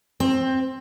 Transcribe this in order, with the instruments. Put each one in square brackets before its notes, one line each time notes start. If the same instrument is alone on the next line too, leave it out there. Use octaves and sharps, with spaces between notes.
[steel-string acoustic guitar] C4